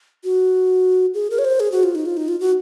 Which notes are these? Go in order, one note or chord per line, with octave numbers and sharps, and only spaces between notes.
F#4
G#4
A#4
C#5
C5
G#4
F#4
F4
D#4
F4
D#4
F4
F#4